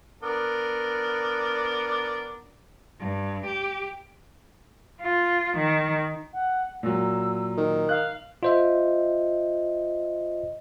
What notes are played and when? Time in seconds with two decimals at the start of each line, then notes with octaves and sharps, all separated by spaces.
0.23 B3 D4 A#4
3.00 G2
3.46 G4
5.01 F4
5.58 D#3
6.32 F#5
6.83 A#2 F#3 E6
7.58 D#3
7.89 F5 F#6
8.43 F4 C5 D#5 E5